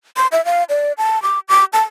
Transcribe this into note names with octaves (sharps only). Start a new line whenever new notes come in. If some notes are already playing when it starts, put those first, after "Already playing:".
C6
E5
F5
D5
A5
D6
D6
A5